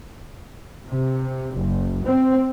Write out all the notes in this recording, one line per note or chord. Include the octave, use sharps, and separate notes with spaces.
C3
F#1
C4